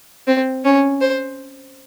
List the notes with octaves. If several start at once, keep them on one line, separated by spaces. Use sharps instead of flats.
C4
C#4
C5